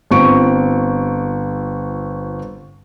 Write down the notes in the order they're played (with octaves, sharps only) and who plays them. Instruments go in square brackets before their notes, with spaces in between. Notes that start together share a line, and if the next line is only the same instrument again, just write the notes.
[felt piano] G1 C4 C#6 D7